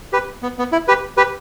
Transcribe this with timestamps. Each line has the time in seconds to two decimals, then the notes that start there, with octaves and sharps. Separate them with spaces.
0.13 G4 B4
0.43 B3
0.59 B3
0.72 E4
0.88 G4 B4
1.17 G4 B4